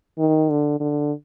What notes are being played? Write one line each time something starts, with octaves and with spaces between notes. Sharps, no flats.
D#3
D3
D3